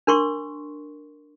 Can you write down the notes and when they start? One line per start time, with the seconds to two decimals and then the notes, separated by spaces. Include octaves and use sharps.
0.07 D4 A#4 C6 C#6